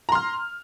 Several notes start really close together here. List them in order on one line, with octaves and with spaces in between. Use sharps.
A#5 C6 F6